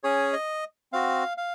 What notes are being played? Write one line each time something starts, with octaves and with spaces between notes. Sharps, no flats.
C#4 G#4 C#5
D#5
C4 F#4 F5
F5